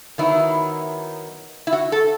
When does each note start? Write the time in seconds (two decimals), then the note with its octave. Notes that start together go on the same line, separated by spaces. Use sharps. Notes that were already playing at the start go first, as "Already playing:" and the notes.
0.18 D#3 F#3 B3 D#4 E4
1.67 E4
1.73 F#4
1.92 A4